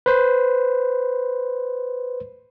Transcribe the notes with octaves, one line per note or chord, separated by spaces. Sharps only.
B4 C5